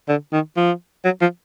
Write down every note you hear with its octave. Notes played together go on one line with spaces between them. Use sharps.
D3
D#3
F3
F#3
F3